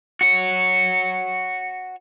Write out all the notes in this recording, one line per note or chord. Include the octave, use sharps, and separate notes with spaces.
F#4 C#5